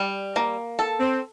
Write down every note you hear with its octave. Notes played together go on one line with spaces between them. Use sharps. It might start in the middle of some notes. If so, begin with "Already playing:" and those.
Already playing: G3
A#3
A4
C4